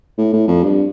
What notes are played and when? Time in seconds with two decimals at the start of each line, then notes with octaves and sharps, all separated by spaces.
0.18 A2
0.33 A2
0.48 F2
0.63 G2